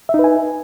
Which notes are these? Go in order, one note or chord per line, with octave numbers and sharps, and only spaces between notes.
D#4 B4 E5 G#5